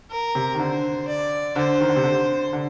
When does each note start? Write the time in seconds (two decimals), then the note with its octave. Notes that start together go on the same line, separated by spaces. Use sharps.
0.11 A#4
0.35 C3
0.55 D#3
0.59 D3 C5
1.08 D5
1.56 D3 C5
1.81 D#3
1.89 D3
1.96 C3
2.03 D3
2.53 D3